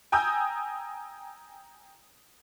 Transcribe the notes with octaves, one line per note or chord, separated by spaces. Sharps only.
G5 G#5 A#5 D#6 E6 G6